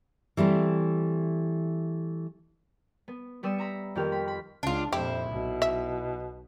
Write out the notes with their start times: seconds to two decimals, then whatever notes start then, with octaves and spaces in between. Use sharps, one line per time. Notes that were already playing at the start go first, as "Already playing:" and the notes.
0.37 E3 G3 A3 C4
3.08 B3
3.43 G3 B3 D5 E6 C#7 D#7
3.58 E5 A#5 B5
3.95 F2 D#3 A#3 G4 F6
4.12 B5
4.28 B5
4.63 C#2 D4 F4
4.93 F2 A#2 E4 G4 C5
5.31 B1 B2
5.62 E5